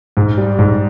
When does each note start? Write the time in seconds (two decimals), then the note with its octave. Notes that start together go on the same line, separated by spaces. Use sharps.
0.17 G#2
0.38 G3
0.59 G#2